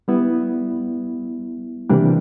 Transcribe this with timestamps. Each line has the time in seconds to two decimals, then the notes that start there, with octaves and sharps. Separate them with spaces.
0.08 G3 B3 E4
1.89 C3 E3 G3 A#3 D4